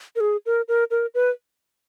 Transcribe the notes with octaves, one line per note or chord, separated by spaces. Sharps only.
A#4
G#4
A#4
A#4
A#4
B4